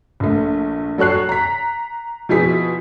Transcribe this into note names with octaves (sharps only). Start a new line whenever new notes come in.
A#1 A3
F#3 A4 C#5 F#6 C7
A#5 B6
B2 F3 E4 G#4 B6